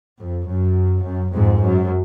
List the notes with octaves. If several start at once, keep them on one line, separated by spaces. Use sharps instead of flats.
F2
F#2
F#2
F2 G#2
F#2